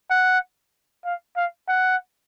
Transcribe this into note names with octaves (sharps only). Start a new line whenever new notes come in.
F#5
F5
F5
F#5